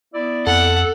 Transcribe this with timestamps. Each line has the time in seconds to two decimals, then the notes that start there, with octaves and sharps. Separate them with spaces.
0.14 B3 E4 D5
0.47 F2 A4 F#5